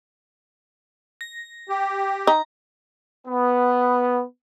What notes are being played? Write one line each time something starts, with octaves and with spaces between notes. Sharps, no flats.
A#6
G4
D#4 A#5
B3